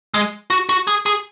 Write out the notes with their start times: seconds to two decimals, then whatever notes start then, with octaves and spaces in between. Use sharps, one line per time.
0.14 G#3
0.50 F#4
0.69 F#4
0.87 G#4
1.06 G#4